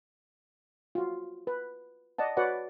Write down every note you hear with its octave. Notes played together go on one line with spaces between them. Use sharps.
F4 F#4
B4
D5 D#5 F#5 A5
F#4 B4 C#5 D5 F#5